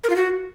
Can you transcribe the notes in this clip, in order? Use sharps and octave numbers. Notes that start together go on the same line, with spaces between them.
A#4
F4
F#4